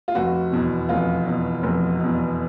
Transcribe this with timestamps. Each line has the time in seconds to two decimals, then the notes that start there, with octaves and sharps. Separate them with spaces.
0.08 F4
0.15 F1 F#4
0.52 E2 B2
0.89 F1 F4
1.25 E2 B2
1.63 F1
2.00 E2 B2